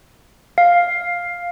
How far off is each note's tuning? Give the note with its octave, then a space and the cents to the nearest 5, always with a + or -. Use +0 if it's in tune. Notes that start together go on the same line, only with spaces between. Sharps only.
F5 +5